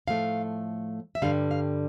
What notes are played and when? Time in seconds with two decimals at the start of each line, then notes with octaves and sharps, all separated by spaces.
0.08 A2 F3 A3 F5
1.15 E5
1.22 G2 D3 G3 F5
1.51 F5